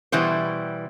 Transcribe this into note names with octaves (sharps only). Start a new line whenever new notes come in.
B2 E3 G3 C5